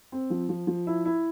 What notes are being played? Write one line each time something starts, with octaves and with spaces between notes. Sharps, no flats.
C4
F3
F3
F3
E4
E4